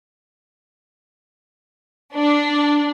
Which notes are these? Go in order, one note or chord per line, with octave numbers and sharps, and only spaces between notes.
D4